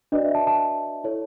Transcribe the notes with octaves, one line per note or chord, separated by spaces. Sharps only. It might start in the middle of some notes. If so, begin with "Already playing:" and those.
D4 F#4 B4 D5 D#5
E5
A5
A5
E4 A4 C#5